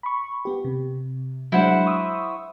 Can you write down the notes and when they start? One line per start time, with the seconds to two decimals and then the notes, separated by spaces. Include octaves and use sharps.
0.03 B5 C#6
0.45 B3 G4
0.65 C3
1.52 F#3 G#3 D4 E4 C5 F#5
1.86 C#6 D#6 E6